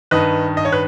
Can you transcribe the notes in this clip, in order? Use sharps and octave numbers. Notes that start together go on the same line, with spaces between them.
G2 D#3 B4 D#5
D#5
C#5
B4